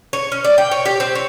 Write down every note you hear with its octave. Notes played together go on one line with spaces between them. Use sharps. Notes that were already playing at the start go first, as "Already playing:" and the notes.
C#5
C#4
D5
G5
C#5
G4
C4
C#5